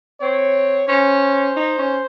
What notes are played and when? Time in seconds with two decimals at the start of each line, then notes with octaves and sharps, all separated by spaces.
0.21 C4 C#5
0.88 C#4 C5
1.56 D#4
1.78 C#4